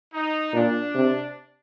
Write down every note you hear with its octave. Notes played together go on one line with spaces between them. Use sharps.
D#4
A#2 D4
C3